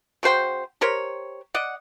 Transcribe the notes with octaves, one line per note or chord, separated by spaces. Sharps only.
C#3 F#4 C5 G5
G4 A#4 C5 C#5
D5 D#5 F#5